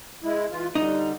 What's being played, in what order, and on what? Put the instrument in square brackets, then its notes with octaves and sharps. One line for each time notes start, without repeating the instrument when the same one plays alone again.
[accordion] G#3 E4
E3 F4
[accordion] D3 G3 [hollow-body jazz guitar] D#4